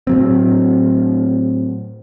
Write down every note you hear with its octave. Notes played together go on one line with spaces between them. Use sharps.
A2 F#3 C4